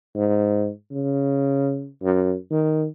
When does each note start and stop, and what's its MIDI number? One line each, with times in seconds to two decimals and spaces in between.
0.16 0.69 44
0.91 1.88 49
2.03 2.35 42
2.51 2.86 51